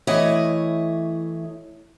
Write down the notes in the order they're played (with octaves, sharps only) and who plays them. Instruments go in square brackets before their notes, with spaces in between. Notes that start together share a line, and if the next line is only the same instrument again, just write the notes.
[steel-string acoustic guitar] E3 A3 E4 C#5 D#5